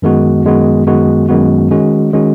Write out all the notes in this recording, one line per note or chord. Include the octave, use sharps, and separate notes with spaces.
F#2 D#3 G#3 B3 F#4
F#2 D#3 G#3 B3 F#4
F#2 D#3 G#3 B3 F#4
F#2 D#3 G#3 B3 F#4
D#3 G#3 C#4 F#4
D#3 G#3 C#4 F#4